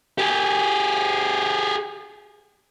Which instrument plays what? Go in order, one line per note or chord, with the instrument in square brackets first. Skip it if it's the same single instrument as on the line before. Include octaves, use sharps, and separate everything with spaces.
[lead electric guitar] G4 G#4